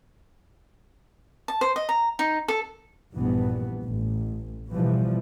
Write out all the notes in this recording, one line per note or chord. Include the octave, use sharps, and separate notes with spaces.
A5
C5
D#5
A#5
D#4
A4
A#1 G2 E3 B3
A1
B2 E3 F3 G3